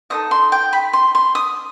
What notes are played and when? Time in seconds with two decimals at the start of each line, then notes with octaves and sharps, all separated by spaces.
0.10 D#4 A4 C5 D#5 D#6
0.31 C6
0.52 G5
0.73 B5
0.93 C6
1.15 C6
1.35 D#6